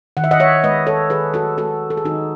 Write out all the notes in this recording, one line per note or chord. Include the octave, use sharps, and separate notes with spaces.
D#3 F#5
E5
D#5 F#5
C#5 E5
G#3 B4 D#5
A4 C#5
D#3 G#4 B4
F#4 A4
G#3 F#4 A4
A4
G#4
D#3 D#4 F#4